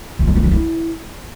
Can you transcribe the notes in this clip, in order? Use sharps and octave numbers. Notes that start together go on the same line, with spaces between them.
F4
G#3
F4
F#3
E4